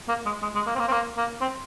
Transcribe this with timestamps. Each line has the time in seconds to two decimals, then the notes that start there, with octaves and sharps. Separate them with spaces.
0.09 A#3
0.26 G#3
0.42 G#3
0.55 G#3
0.67 A#3
0.75 C4
0.79 A#3
0.88 C4
0.92 A#3
1.17 A#3
1.41 C4